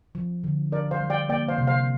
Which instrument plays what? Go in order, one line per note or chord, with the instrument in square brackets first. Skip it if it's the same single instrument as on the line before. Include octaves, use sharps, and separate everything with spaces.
[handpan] F3
D3
[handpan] D4 [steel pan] A#4 D5
[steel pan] C5 F5
[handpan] G3
[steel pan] D5 G5
[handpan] A#3 [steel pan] D5 G5
[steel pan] C5 F5
[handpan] C3
[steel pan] C5 F5